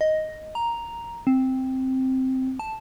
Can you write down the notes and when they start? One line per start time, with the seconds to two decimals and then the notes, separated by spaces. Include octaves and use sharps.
0.01 D#5
0.55 A#5
1.27 C4
2.59 A5